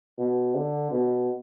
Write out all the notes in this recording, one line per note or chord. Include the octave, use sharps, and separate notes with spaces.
B2
D3
B2